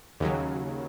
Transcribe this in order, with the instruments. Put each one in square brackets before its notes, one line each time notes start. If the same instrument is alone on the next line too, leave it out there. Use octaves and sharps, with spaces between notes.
[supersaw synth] D#2 C#3 F#3